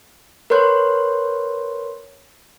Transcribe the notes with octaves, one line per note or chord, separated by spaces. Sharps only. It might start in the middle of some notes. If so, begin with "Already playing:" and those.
A#4 B4 C#5 C6 F#6 G6